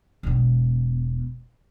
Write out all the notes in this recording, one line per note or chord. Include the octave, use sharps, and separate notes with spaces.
E1 B3